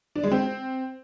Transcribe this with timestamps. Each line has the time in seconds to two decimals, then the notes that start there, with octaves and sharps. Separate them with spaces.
0.16 D4
0.24 G#3
0.32 C4